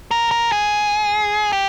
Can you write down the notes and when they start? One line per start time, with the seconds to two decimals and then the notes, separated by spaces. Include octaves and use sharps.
0.11 A#4
0.31 A#4
0.52 G#4
1.53 G4